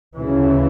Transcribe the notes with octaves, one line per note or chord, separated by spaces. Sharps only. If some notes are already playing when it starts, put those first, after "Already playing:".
D2 C#3 E3